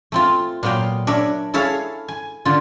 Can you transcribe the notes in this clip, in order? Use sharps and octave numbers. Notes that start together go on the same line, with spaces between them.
A3 C4 F4
A#2 F#3 B3 F5 G5
D4 A#4 C#5 E5 B5
E4 G#4 A4 C#5 E5 F5
G#5
D3 F4